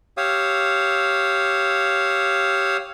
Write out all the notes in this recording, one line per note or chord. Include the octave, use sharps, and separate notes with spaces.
G4 C#5 F5 D#6 E6